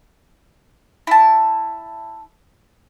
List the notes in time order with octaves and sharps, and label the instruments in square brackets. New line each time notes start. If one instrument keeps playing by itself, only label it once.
[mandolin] E4 A5